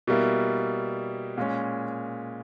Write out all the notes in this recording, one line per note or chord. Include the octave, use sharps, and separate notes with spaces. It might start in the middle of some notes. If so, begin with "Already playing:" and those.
B2 G3 A#3 E4
A#2 G#3 C#4